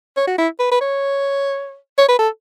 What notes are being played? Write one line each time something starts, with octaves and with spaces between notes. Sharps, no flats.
C#5
F#4
E4
B4
B4
C#5
C#5
B4
A4